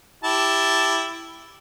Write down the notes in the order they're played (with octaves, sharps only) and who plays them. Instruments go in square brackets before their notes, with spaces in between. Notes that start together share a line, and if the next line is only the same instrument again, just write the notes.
[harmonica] E4 G4 A5